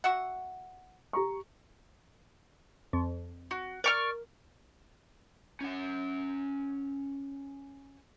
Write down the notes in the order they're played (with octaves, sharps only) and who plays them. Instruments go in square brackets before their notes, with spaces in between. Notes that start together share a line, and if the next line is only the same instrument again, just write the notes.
[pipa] F#4 E5 F#5
[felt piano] G4 A#5 C#6
[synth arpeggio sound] F2
[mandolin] F#4
[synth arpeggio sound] A#4 [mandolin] D5 C#6 F6
[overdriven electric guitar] C#4 F#5